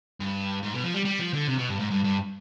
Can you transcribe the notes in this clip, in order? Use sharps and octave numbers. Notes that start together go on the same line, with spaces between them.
G2
G#2
B2
F3
G3
G3
F3
D3
C3
B2
G2
G#2
G2
G2